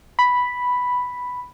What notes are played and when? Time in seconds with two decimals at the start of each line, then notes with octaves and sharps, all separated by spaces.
0.19 B5